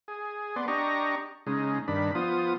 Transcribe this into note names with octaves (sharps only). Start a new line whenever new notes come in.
G#4
B3 D5 C6
D4 G4 D#5 A#5 C#6
C#3 G#3 D#4
G2 D#3 D4 B5
F3 B3 F4 D#6